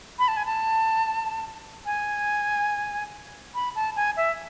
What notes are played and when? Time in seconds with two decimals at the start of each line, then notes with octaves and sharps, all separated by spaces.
0.19 B5
0.28 A5
0.37 G#5
0.46 A5
1.86 G#5
3.55 B5
3.76 A5
3.96 G#5
4.17 E5